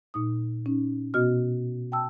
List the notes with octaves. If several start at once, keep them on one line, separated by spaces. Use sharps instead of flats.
A#2 D#4 D#6
C#4 D#4
B2 B3 F#4 D#5 F6
G5 A5 E6